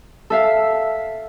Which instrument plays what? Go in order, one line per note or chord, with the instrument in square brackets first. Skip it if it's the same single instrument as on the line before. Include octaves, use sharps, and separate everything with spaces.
[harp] A4 E5 F5